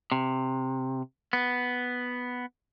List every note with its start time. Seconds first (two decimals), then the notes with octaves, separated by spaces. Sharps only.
0.12 C3
1.33 B3